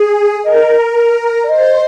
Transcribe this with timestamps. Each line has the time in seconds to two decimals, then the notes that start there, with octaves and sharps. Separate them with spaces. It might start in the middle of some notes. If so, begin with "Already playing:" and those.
Already playing: G#4
0.44 A#4 D#5
1.43 D5
1.48 C5 D#5